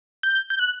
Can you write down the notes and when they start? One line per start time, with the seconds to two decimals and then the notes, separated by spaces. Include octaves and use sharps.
0.23 G6
0.50 G6
0.59 F#6